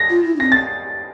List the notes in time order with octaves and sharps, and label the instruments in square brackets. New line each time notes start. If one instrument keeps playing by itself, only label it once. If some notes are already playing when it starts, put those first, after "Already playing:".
Already playing: [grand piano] A#6
[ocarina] F4
E4
D4
[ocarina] C4 [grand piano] A#6
[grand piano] A6